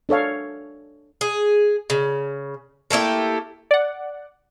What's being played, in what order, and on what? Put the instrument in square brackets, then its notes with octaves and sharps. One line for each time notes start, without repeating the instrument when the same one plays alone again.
[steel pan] D4 A4 C#5 F5
[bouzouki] G#4
C#3
A3 A#3 E4 G4
[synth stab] D5 F#5